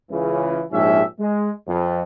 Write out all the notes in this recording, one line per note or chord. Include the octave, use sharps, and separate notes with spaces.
C#2 C#3 E3
A#1 G#2 F3 C#4 G4 E5
G#3
F2